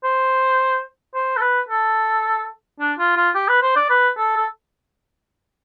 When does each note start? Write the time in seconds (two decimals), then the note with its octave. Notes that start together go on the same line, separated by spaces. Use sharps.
0.04 C5
1.15 C5
1.37 A4
1.41 B4
1.69 A4
2.80 D4
2.99 F4
3.17 F4
3.35 G4
3.48 B4
3.62 C5
3.76 D5
3.90 B4
4.18 A4
4.37 A4